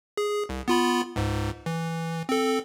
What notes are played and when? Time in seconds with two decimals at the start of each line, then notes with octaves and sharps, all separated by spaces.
0.17 G#4
0.49 C2
0.68 B3 F4 B5
1.16 C#2 G#2
1.66 E3
2.29 C4 A4